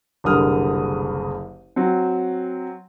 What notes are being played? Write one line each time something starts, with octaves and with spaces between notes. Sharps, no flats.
F#1 C2 D3 A#4 D#6 F6
F#3 C4